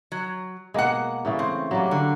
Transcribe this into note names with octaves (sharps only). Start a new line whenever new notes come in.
F#3
B2 G#3 A#3 F#5
C#3 E3 A3
C4
F#3 G3 A#3
D3